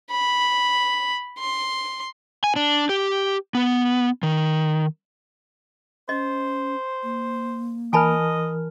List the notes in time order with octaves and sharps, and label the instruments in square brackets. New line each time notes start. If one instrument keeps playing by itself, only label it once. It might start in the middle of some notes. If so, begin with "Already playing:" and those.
[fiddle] B5
C6
[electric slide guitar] G#5
D4
G4
B3
D#3
[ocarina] C#4 [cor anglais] C5 [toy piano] D#5
[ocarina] A#3
[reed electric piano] E3 A#4 F6 [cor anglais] D#5 [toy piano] G#5 A5 B5